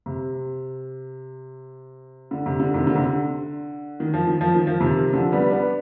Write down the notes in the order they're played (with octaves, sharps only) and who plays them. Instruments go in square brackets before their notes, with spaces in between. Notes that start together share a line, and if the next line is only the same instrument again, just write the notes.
[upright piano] C3
D3
C3
D3
C3 D#3
D3
C3
D3
D#3
F3
D#3
F3
D#3
F3
C3 D#3
D3 F3
G3 B3
B3 D4